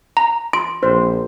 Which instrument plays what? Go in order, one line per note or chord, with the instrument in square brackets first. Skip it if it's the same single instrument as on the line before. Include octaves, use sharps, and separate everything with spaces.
[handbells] A#5
[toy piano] C6 [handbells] D7
[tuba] A#1 [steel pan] C5